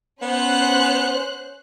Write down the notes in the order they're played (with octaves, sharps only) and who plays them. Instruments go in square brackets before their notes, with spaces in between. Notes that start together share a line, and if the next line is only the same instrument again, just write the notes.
[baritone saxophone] B3 [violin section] C#4 C5 F#6